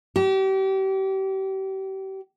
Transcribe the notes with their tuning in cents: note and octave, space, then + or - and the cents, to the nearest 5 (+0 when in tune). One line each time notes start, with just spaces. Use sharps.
G4 -35